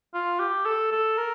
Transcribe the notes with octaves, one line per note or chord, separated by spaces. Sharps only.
F4
G4
A4
A4
A#4